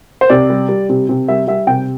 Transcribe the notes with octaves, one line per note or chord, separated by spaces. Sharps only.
C5
C3 D5
G3
G3
C3
C3
G3 E5
G3 E5
C3 G5